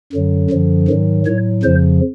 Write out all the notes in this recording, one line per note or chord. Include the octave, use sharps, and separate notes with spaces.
F#2 D3 F#3
F#2 D3 F3
G#2 D#3 F#3
A2 F#3 C#5
F2 C#3 F3 C5